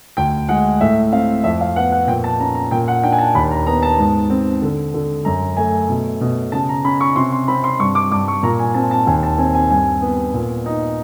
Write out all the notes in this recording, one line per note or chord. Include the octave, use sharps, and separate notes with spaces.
D2 G5
G#3 F#5
A2 E5
C4 F5
F2 E5
F5
B3 F#5
F#5
A#2 G5
A5
C#4 A#5
A#5
A#2 G5
F#5
D4 G5
G#5
A5
D#2 B5
A#5
B3 A#5
A5
G#2
C4
D3
D3
F#2 A#5
A3 G#5
B2
B2
C#3 A5
A#5
C#4 B5
C#6
C3 C6
C6
C4 B5
C6
G2 C#6
D6
G2 D6
C#6
A#2 A#5
G#5
C4 A5
A5
D#2 G#5
A5
C4 G#5
G#5
G2 G#5
B3
A#2
D#4